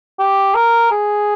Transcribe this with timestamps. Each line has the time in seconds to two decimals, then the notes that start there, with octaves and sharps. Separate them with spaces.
0.19 G4
0.54 A#4
0.91 G#4